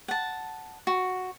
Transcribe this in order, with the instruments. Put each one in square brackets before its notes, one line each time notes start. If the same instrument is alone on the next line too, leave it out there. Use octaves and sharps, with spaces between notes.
[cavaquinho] F#5 A5
F#4